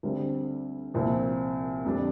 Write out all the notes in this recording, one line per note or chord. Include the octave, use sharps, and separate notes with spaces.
D2 D3 G3 C4
C2 A#2 F3 C4
F2 D3 G3 D4